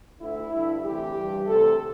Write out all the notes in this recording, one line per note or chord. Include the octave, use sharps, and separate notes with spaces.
D2 D3 E4
G2 D3
D2 C3 E3 G4
G2 E3
D2 C3 E3 A4